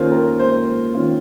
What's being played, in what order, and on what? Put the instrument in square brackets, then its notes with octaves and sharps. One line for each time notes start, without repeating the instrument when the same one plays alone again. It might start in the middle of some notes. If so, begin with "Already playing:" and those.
Already playing: [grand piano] D#2 D#3 A#3 C#4 F4 C5
A#4
C5
D#3 A#3 C#4 F4